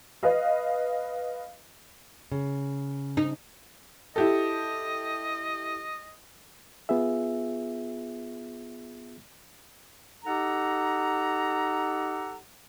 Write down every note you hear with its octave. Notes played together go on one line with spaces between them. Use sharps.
B4 D#5 F5
C#3
D#4
E4 G4 A4 D#5
B3 F4 G#4 E5
D#4 G4 A4 F#5 A#5